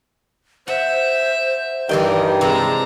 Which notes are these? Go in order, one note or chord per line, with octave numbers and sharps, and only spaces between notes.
C5 E5 F#5
G2 D#3 E3 G3 G4 D#5 G5
C3 E3 G#3 A5 A#5